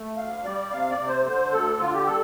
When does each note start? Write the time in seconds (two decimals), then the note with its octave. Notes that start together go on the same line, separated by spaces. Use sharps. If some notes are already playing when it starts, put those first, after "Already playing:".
Already playing: A3
0.17 D2 F5
0.45 G3 D5
0.72 C3 F5
0.89 D5
0.99 C3
1.08 C5
1.25 D3 C5
1.53 D2 A4
1.80 D3 F4
1.94 G4
2.07 G3 A4